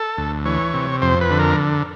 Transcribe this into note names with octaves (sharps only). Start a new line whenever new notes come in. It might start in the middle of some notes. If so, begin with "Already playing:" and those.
Already playing: A4
D2
E3 C#5
C3
F2 C5
B4
D3
A#4